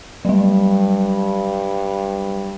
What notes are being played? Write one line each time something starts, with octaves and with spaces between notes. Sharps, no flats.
G2 F#3 G3